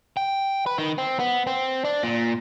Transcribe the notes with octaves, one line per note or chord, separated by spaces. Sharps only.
G5
B4
D#3
C4
B3
C4
D4
A#2